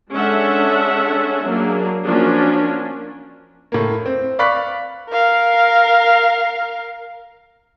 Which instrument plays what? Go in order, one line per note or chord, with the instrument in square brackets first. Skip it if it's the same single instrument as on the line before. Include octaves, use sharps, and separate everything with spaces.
[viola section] G#3 C#4 D4 A4 E5 F#5
F#3 A#3 D4 G#4
F3 A#3 C#4 D4 F#4
[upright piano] A2 A#3
C4
D5 F5 B5 C#6 F#6 B6
[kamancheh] A#4 F5